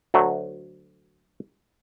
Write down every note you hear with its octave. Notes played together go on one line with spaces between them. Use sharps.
D2 F#3 A3